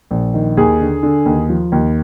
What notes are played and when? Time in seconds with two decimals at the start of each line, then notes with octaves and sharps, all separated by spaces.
0.11 A#1
0.34 D#3
0.57 D#2 G#4
0.80 D3
1.03 D3
1.26 D#2
1.49 F3
1.72 D#2